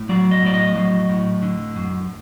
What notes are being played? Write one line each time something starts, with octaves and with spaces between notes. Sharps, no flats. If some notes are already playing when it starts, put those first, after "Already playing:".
Already playing: A2
F#3 D5
D#5
A2 D5
D#5
F#3
A2
D3
F#2